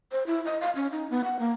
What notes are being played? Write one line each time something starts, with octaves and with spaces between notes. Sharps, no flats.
C5
E4
D#5
F5
C#4
D#4
B3
F#5
A#3